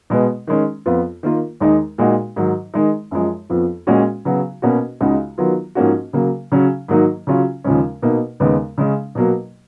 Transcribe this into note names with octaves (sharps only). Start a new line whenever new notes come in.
B2 G#3 B3
D#3 G#3 C#4
F2 F3 B3 F4
D#3 A#3 F4
D#2 D#3 G#3 D#4
A#2 G#3 D#4 F#4
G#2 D#3 F#3
D#3 G#3 D#4
F#2 F3 G#3
F2 F3 B3
A#2 G#3 C#4 F#4
C#3 F#3 B3 F#4
B2 A#3 C#4 F#4
C#2 C#3 G#3 D#4 F#4
D#3 F#3 B3 F4
G#2 F3 A#3 C#4 F#4
C#3 F#3 A#3
C#3 F#3 C#4
G#2 D#3 F#3 A#3 D#4
C#3 F#3 C#4 F4
D#2 C#3 F3 G#3 C#4
B2 A#3 D#4
D#2 C#3 G#3 B3
C#3 G#3 C#4
B2 F#3 A#3